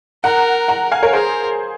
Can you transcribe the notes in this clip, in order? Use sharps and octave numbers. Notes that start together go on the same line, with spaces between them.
A#4 F#5 A#5
F#5 A#5
F5 G#5
A#4 C#5
G#4 A#4 C5